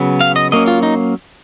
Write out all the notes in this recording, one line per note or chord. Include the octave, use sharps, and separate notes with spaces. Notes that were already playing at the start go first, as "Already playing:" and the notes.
Already playing: C#3 F#3 B3
F5
D#5
F#3 A#3 C#4 D#5
F4
D#4